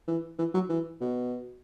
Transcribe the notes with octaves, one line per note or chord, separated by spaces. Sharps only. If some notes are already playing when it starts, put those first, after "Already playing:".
E3
E3
F#3
E3
B2